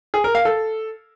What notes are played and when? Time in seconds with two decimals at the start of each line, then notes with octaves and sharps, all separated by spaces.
0.14 G#4
0.24 A#4
0.35 F5
0.45 A4